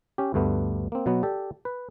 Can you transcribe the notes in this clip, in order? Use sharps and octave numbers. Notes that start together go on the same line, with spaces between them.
C#4 G4
D2 G2 A3 B3
A#3 C4
B2 F#3 B3
G4 A4 D5
B4